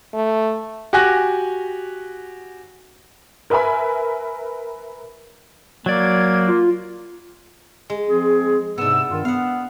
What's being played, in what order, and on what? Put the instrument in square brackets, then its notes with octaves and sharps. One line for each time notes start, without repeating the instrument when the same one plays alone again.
[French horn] A3
[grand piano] F#4 G4 G#5 F#6 A#6
[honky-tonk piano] A#4 B4 E5 G#5 B5
[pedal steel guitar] F#3 D5 [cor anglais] A#3 [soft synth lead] G#6
[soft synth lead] F4
[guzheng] G#3
[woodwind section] F3 C4 G#4
[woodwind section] G#2 C3 E6 [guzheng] B3 D4
[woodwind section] G2 D#3 F4
[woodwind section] B3 [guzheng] F5 F#5